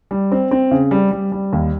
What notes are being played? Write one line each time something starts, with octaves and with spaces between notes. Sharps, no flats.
G3
C4
C4
C#3
G3
G3
G3
D#2